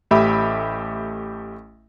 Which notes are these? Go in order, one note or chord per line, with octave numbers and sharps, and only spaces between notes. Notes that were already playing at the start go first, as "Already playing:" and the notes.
A1 A3 G4 E5 B5